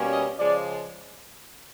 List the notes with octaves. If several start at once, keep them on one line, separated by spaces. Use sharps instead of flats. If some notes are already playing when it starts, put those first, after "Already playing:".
Already playing: B2 G3 A#3 C#4
D#5
C#3 F3 G#3 D5